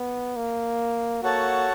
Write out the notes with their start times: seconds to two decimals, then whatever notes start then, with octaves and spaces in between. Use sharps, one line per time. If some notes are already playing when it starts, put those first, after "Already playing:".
Already playing: B3
0.36 A#3
1.22 A#3 F#4 A4 C#5 F#5 A5